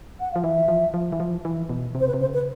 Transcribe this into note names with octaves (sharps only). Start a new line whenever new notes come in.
F#5
F3 F5
E3 E5
F3
F3
E3
F3
E3
B2
C3
C5
B4
C3
C#3 C5
B4